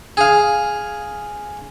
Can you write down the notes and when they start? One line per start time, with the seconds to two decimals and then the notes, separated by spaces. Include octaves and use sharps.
0.17 G#4 F5